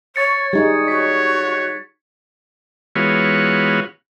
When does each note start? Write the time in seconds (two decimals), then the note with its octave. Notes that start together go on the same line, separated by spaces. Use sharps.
0.16 C#5 C#6 A6 C#7
0.53 G3 D#4 G#4 G#6
0.88 F#4 C#5 B6
2.95 E3 G#3 B3 F4 F#4 C#5